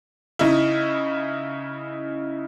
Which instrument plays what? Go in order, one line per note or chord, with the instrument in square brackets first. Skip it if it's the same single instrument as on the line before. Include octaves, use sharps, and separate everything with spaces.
[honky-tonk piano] C#3 D#4 E4